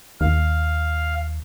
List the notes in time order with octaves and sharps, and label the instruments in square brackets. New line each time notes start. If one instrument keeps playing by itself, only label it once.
[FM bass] D#2 [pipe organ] F5